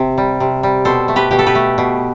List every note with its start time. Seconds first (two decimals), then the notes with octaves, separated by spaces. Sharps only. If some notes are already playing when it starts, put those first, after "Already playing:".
Already playing: C3
0.18 G3
0.40 C3
0.63 G3
0.85 B2 A4 C5
1.08 A3
1.16 G4 B4
1.31 B2 G4
1.39 A4
1.46 G4 B4
1.55 A3
1.78 B2